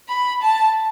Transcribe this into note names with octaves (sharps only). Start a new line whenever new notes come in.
B5
A5